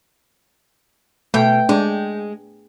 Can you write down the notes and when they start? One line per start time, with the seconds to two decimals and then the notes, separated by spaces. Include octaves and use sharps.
1.34 B2 A3 G5
1.69 G#3 D4